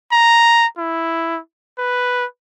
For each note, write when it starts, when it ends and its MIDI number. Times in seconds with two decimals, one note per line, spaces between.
0.12 0.67 82
0.78 1.39 64
1.78 2.25 71